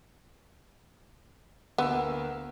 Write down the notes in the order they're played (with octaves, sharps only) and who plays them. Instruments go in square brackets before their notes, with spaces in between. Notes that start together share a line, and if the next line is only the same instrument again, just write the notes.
[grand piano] D2 A#3 E6 [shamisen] B3